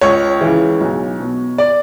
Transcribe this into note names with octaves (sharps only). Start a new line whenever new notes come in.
C#2 C#5
C#3 E3
B1
B2
D5